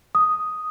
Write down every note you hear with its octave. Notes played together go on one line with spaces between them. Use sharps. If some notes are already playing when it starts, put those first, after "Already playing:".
D#6